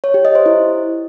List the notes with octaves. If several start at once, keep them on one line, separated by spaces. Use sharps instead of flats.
C#5
G4
D#5
C5
E4